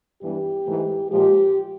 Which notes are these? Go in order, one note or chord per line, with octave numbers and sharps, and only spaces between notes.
G2 E3 G3 B3 G4
G#2 E3 A3
A#2 F3 G#3 G4